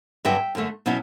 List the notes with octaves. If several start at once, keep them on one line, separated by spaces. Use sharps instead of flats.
G2 D3 F#3 C#4 E5 G5
F#2 D3 A3
B2 F#3 C#4 E4